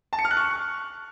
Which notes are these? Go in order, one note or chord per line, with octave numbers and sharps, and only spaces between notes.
A5
C#7
F6
F#6
C#6